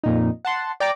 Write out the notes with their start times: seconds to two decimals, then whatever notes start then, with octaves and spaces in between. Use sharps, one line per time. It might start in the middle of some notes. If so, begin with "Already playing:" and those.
0.04 F2 A#2 D#4
0.45 F#5 A5 C6
0.80 D5 G5 A#5 D6